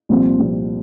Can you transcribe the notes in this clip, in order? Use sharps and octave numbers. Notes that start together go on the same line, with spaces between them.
C2 A#2 F3 C4
C2 A#2 F3 C4